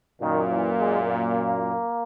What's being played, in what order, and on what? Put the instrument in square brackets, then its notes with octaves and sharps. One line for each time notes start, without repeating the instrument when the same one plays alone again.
[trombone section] F#2 A#2 [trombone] D#3
[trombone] E3
G#3
A#3